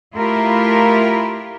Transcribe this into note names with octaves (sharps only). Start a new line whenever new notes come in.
A3 E4 F4 G4 A#4